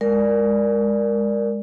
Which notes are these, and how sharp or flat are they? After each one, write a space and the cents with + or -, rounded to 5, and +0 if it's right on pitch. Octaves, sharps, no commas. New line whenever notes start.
G#3 -10 A#4 +0 D5 +0